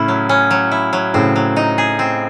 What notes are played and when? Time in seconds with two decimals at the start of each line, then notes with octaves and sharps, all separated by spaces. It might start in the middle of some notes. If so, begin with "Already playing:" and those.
Already playing: A2 C#3 C#4 E4
0.08 F#3
0.29 C#4
0.51 F#3
0.72 E4
0.93 F#3
1.14 A2 C#3 C4
1.36 F#3
1.56 D#4
1.78 G#4
1.99 C4